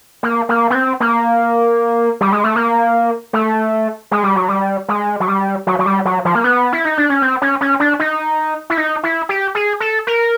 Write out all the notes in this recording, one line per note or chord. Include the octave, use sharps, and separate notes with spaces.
A#3
A#3
B3
C4
A#3
G3
G#3
A3
A#3
A3
G#3
G3
F#3
G3
G#3
F#3
G3
F#3
F#3
G3
F#3
F3
A#3
B3
E4
D#4
D4
C#4
C4
C#4
C#4
D4
D#4
E4
D#4
E4
G4
G#4
A4
A#4